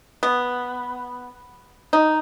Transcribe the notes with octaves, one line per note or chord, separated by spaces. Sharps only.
B3
D#4